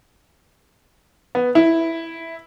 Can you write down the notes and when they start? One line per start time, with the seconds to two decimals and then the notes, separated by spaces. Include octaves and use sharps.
1.35 B3
1.55 E4